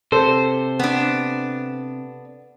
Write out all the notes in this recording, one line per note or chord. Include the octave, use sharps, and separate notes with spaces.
C3 A4 C5
B3 D4